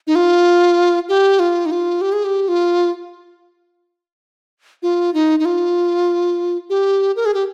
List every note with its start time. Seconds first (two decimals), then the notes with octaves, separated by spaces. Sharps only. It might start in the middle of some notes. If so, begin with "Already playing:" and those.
0.07 D#4
0.15 F4
1.09 G4
1.39 F4
1.66 D#4
1.71 F4
2.01 G4
2.13 G#4
2.24 G4
2.48 F4
4.82 F4
5.14 D#4
5.39 D#4
5.45 F4
6.70 G4
7.16 A#4
7.26 G#4
7.34 G4